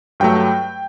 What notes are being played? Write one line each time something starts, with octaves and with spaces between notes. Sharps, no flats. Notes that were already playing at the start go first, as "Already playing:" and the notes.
G2 F#3 A3 G5